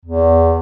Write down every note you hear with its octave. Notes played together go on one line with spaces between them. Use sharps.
E2